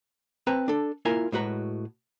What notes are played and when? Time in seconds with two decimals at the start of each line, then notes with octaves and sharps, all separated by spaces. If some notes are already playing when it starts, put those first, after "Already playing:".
0.47 C4 B4 A5 A#5
0.68 D4 A4
1.05 A#3 E4 F4 A#4 G#5
1.32 A2 G#3 F#4 B4 A#5